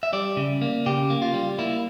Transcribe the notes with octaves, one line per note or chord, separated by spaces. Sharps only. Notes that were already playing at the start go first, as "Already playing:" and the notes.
E5
G3 D5
C#3
A#3
C#3 G4
A#3
F4
G3
A#3 E4